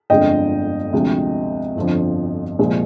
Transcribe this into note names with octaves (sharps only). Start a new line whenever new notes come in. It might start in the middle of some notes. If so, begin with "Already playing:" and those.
G1 F2 D3 G#3 D#5 G5
D2 C3 F3 G#3
G1 F2 D3 F3
C2 A#2 F3 G#3